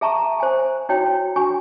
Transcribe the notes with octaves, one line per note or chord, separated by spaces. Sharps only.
G#4 E5 A5 A#5 C#6
C5 G#5
D#4 E4 F#4 C#5 G5
D4 F#4 G#5 C#6